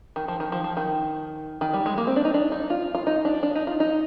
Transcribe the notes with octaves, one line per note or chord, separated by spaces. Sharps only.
D#3
F3
D#3
F3
F3
D#3
D#3
G3
G#3
A#3
C4
D4
D#4
D4
D#4
F4
F4
D#4
D4
D4
D#4
F4
D#4